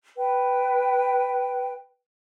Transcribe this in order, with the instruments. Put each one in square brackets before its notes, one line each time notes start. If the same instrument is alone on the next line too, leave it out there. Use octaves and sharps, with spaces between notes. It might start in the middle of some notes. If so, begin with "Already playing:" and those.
[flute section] B4 G5